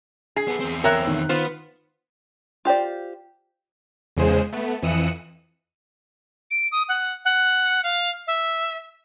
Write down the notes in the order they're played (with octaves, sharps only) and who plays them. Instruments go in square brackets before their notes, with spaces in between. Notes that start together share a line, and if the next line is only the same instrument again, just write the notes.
[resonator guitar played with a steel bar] G#4 [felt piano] C7
[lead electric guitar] B3 A4
E2 C4
[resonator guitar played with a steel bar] A#4 C#5 E5 [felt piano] G5 F#6
[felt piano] D#3
[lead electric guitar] B3 [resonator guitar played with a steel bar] F4 C5
[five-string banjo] F4 G4 C5 D5
[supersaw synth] E2 C#3 G#3 G#4 C5 E7
A3 B3
F2 E3 D#6 E6 F#6 C#7
[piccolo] D7
D#6
F#5
F#5
F5
E5